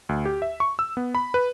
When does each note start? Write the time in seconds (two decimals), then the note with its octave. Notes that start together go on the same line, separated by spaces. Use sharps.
0.09 D2
0.25 G4
0.42 E5
0.60 C#6
0.79 E6
0.97 B3
1.15 B5
1.34 B4